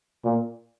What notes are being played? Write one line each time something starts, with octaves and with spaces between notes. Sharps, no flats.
A#2